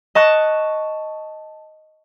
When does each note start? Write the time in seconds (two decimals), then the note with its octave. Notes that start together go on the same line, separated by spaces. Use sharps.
0.15 D#5 A5 C#6 F#6